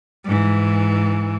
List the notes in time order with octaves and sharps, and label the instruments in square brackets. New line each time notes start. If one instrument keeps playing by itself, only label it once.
[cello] G#2 E3